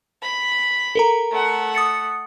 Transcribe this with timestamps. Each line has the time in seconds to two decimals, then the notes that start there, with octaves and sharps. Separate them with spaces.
0.22 B5
0.95 A4 A#4 A#5
1.31 A3 F#5
1.75 D#6 A6 C#7